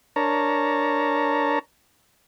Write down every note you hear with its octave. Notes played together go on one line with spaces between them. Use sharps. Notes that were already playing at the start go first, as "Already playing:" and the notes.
D4 A#4 C#5 A5 A#5